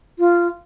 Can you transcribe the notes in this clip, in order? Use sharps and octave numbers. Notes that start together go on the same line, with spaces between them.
F4